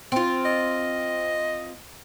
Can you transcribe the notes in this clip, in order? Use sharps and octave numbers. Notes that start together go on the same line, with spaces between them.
C4 F4
D#5